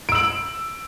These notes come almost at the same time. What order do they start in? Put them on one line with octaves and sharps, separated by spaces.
D7 E6 F#7